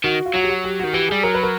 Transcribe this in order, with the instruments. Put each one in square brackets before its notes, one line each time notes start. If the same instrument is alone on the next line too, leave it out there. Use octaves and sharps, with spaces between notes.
[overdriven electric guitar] D#3 [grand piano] F#4
[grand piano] F4
[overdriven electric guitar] F#3 [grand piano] F#4
[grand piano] G4
F#4
G4
[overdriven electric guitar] D#3 [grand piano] F#4
[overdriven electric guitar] E3 [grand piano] G4
[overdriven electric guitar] G3 [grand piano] G#4
[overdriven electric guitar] F#3 [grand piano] A#4
[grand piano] B4
A#4